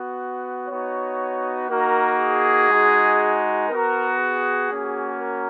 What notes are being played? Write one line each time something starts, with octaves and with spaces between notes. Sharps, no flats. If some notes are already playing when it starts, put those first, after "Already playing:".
Already playing: B3 F#4
B3 D#4 F#4 C#5
A#3 D#4 F#4 A#4
G#4
G#3 D#4 F#4
B3 F#4 A#4
G#4
A#3 C#4 F#4
A#4